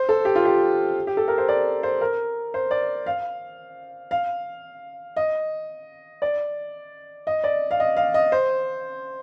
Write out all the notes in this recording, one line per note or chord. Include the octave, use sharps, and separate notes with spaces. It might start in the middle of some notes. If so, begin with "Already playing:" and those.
Already playing: C5
A4
G4
F4
G4
G4
A4
A#4
C5
D5
C5
A#4
C5
D5
F5
F5
D#5
D5
D#5
D5
F5
D#5
F5
D#5
C5